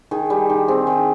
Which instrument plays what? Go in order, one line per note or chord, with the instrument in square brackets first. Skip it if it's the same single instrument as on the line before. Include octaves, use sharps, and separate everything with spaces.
[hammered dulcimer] D#3 G#4
G3
D#3
C4 G#4
D#3